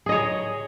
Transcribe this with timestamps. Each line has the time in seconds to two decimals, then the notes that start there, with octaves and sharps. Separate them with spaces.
0.06 G#4
0.09 D#5
0.12 C#5